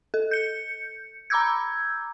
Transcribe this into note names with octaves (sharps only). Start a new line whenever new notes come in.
A4
G6 C#7
A#5 B5 D6 E6 G6 G#6